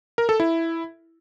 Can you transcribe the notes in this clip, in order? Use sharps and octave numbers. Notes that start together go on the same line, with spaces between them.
A#4
A4
E4